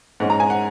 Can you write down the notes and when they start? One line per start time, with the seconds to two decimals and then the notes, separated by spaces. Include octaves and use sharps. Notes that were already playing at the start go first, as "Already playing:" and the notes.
0.20 G#2 G#3 C#4 F#5
0.30 A#5
0.40 G#5
0.50 F#5